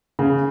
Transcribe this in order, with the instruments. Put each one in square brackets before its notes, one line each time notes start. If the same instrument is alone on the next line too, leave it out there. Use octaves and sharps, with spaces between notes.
[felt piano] C#3